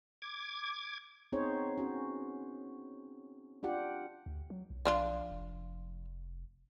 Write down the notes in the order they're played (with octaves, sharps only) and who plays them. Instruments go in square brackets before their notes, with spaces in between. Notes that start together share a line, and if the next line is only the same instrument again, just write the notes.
[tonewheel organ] D6 G#6
[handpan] B3 C4 D#4 G#4 C5 C#5
C#4 F#4
D4 F4 G4 F#5
[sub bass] D2
F#3
B1
[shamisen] F3 D4 F4
[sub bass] F1